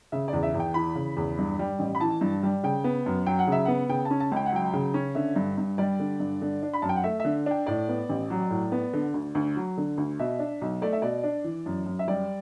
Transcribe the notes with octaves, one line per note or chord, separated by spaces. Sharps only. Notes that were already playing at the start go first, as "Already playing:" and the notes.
C#3 E5
D5
E2
E5
E2
G5
E3 B5
C#3
E2
G2
G3
A1
B5
E3 A5
G2
G3
C#3 G5
B3
F#2
F#3 G5
F#5
C#3 E5
B3 F#5
C#3 G5
A5
C#4
A5
C#2 G5
F#5
F#3 G5
C#3
C#4
D3 E5
G2
G2
G3 D5
D3
G2
D3
D4
B5
F#2 A5
G5
F#5
A3 E5
D3 E5
D4 G5
A2 D5
B3
A1
F#3
A2
B3
D3
D2
D2
F#3
D3
D2
B2 E5
D4
B1
A3 D5
E5
B2 D5
D4
E3
F#2
F#2
E5
G3 D5